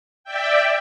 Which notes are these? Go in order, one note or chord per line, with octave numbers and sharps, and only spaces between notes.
D5 E5 G5